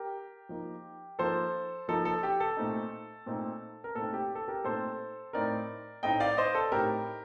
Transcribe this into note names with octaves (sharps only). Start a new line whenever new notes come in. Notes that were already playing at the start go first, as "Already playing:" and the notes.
Already playing: G4 A#4
F3 A#3 D#4
F3 A#3 D#4 A4 C5
F3 A#3 D#4 A4
A4
G4
A4
A#2 A3 C4 D#4
A#2 A3 C4 D#4
A#4
A#2 A3 C4 D#4 A4
G4
A4
G4 A#4
A#2 A3 C4 D#4 A4 C5
A2 A3 C4 D#4 A#4 D5
A2 A3 C4 D#4 D#5 G5
D5 F5
C5 D#5
A4
A2 A3 C4 D#4 G4 A#4